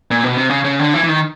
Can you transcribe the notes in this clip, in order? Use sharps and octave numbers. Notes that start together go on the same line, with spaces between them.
A#2
B2
C3
C#3
C#3
D3
E3
E3
D#3